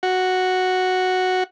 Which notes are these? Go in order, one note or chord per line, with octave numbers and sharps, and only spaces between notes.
F#4